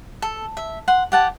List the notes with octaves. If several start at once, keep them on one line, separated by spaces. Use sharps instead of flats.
A4
E5
F#5 C6
G4 F#5 A5